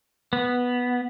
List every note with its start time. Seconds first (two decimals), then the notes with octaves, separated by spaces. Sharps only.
0.33 B3